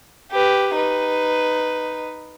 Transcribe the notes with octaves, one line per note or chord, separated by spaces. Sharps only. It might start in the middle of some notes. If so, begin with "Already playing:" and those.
G4 B4
D#4 B4